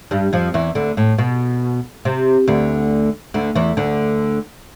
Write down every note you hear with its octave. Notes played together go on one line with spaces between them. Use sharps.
G2 G3
F2 F3
E2 E3
D2 D3
A2
B2
C3
D2 D3
D2 D3
E2 E3
D2 D3